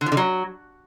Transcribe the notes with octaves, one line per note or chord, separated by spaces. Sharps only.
D3
F3
D3
F#3